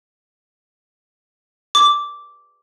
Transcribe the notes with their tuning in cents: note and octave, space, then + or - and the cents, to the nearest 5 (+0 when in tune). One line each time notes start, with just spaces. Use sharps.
D6 -10